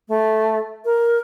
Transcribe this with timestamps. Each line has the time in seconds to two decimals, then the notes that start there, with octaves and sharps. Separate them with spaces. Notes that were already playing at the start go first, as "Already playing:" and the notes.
0.09 A3
0.85 A#4